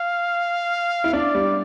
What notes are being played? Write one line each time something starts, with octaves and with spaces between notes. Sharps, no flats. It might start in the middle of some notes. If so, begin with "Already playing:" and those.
Already playing: F5
E4
D4 D5
G3